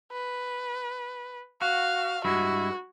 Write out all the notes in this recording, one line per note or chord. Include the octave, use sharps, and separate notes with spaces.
B4
F#4 F5
G2 G#3 E4 F#4